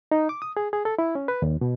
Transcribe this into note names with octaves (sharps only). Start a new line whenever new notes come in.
D#4
D6
D#6
G#4
G#4
A4
E4
C#4
B4
D#2
B2